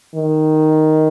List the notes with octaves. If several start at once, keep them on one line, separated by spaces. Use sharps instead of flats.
D#3